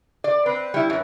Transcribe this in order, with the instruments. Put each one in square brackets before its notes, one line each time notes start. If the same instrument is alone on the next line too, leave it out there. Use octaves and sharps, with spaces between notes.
[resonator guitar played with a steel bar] D5
[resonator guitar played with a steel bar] C4 [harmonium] B4
[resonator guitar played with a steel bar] G3 E4
F#2